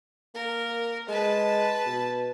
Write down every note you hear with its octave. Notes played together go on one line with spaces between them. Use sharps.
A#3 A#4
G#3 B4 A5
B2